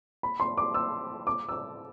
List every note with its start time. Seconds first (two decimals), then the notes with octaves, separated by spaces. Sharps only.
0.23 B5
0.40 C6
0.57 D6
0.74 E6
1.27 D6
1.49 E6
1.52 D6